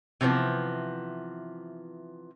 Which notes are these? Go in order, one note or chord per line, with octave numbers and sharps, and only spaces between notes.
C3 E3 F3 B3